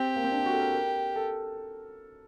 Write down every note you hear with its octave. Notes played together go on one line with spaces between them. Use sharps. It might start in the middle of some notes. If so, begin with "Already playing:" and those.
Already playing: C4 G4
A#3
C4
D4
F#4
A4
A#4
A#4
A4